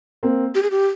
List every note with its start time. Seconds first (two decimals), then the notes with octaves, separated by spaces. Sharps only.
0.23 A#3 C4
0.55 G4
0.63 G#4
0.71 G4